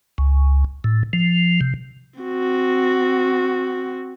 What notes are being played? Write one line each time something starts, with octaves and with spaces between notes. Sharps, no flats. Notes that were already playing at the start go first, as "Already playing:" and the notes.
C#2
A2
F3
C3
C4 F#4